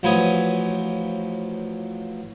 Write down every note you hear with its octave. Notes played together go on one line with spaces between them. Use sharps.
A1 F3 F#3 B4 G#5 D#6